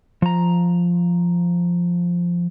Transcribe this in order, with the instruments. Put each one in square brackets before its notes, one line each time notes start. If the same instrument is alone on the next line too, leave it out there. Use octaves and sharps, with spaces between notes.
[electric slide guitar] F3 A#5